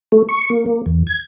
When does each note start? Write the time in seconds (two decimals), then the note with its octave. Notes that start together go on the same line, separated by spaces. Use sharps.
0.12 A3
0.29 C#6
0.50 A#3
0.66 A#3
0.86 E2
1.07 G#6